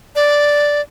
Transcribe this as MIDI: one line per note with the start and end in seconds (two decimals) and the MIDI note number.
0.15 0.81 74